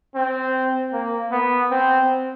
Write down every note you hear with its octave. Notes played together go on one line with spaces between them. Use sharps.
C4
A#3
B3
C4